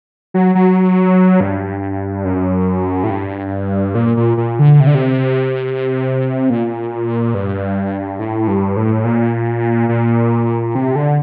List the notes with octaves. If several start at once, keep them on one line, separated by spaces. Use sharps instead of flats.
F#3
F#3
G2
F#2
A2
G2
A#2
A#2
A#2
D3
C3
D3
C3
A#2
G2
A2
G2
A2
A#2
A#2
C3
D3